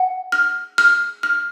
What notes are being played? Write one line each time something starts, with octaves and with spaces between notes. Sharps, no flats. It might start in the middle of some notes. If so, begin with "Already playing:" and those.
Already playing: F#5
F6
F6
F6